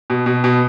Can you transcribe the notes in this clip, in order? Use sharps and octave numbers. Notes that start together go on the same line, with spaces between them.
B2
B2
B2